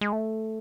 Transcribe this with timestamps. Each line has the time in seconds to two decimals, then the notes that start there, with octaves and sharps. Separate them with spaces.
0.01 G#3
0.12 A3